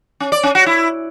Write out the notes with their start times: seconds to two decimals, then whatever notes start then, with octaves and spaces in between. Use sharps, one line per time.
0.20 C#4
0.32 D5
0.43 C#4
0.55 F#4
0.66 E4